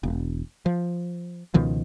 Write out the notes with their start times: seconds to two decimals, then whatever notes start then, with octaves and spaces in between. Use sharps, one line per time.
0.03 E1
0.66 F3
1.54 C#2 B2 D#3 F3